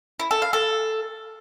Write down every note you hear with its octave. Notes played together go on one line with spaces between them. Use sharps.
E4
A4
F5
A4